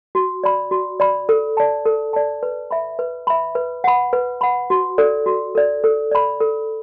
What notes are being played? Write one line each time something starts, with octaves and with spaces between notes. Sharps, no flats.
F#4
D5 B5
F#4
D5 B5
A4
D5 A5
A4
D5 A5
B4
E5 B5
B4
E5 B5
B4
F#5 B5
B4
F#5 B5
F#4
A4 D5
F#4
A4 D5
A4
D5 B5
A4